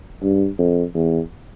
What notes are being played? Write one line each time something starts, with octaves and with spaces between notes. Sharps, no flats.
G2
F2
E2